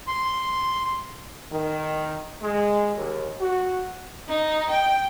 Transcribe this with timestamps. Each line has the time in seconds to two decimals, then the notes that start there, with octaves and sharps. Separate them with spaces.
0.07 C6
1.52 D#3
2.42 G#3
2.95 D#2
3.41 F#4
4.28 D#4
4.70 G5